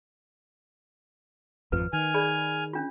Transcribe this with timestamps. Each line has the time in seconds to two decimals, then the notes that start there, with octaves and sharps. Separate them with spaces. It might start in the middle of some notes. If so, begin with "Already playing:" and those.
1.72 G#1 F2 F3 B4
1.93 D#3 G#5 F6
2.14 G#4 D5 B5
2.73 C#4 D4 F4